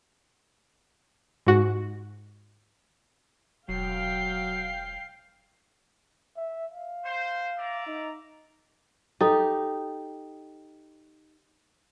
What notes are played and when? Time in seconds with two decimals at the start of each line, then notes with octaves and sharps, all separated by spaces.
1.47 G#2 F#4
3.69 E1 F#3 F5 G5 C7
6.37 E5
6.74 F5
7.05 C5
7.57 D5 E5 A#5
7.87 D#4
9.21 D#4 G4 A4